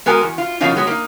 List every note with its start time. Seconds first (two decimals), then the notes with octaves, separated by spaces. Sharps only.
0.06 G#3 B3 F#4 A#4 G#5
0.22 E2
0.38 F4
0.60 B2 F3 A#3 C#4 D#4 F4
0.75 F#3 G#3 B3
0.87 A#3 D#4